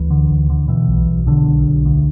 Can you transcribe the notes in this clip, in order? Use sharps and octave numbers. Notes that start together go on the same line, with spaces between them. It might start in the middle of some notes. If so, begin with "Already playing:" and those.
Already playing: D2 E3
D3
D2
D3
B2 E3
B1
B1
B2 D3
B1
B1
D2